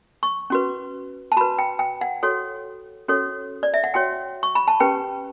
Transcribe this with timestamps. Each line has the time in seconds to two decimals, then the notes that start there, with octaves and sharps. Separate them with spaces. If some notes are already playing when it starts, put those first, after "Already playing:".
0.23 C#6
0.50 C#4 F#4 B4
1.32 A5
1.37 F#4 B4 B5
1.59 G5
1.79 G5
2.01 F#5
2.23 F#4 A4 C#5
3.08 C#4 F#4 A4 C#5
3.63 D5
3.74 E5
3.84 F#5
3.94 F#4 C#5 G5
4.43 C#6
4.55 B5
4.68 A5
4.80 C#4 G4 B4 G5